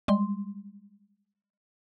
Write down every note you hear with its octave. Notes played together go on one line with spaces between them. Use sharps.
G3 G#3 C6